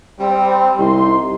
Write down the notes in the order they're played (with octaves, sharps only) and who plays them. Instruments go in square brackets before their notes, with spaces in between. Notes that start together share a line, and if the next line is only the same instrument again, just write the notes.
[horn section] G3 C4
[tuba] C2 [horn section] D#4 C6